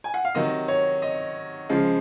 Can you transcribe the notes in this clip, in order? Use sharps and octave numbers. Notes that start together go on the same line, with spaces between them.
G#5
F#5
F5
C3 D#3 F#3 D#5
C#5
D#5
C#3 F3 G#3